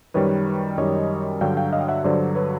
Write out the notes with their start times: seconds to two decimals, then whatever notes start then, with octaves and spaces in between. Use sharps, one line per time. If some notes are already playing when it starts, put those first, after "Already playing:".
0.14 F#2 D#3 G3 B4 C#5
0.78 F#2 D#3 G3 C#5 D#5
1.41 G2 D3 F#3 F5 G5
1.57 F5 G5
1.73 D#5 F5
1.80 G5
1.88 E5 F#5
2.04 G2 D3 F#3 C5 D5
2.35 B4 C#5